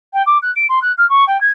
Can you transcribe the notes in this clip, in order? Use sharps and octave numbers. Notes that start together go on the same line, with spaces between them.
G5
D6
F#6
D7
C6
F#6
F6
C#6
G5
G#6